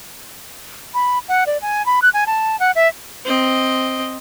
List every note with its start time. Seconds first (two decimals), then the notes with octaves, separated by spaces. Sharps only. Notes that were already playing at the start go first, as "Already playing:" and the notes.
0.94 B5
1.29 F#5
1.46 D5
1.62 G#5
1.86 B5
2.02 F#6
2.14 G#5
2.27 A5
2.60 F#5
2.75 E5
3.25 C4 D#5